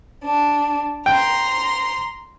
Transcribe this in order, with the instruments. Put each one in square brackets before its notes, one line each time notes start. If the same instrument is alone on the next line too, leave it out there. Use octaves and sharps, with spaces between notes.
[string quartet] D4
[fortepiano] G5 [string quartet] A#5 C6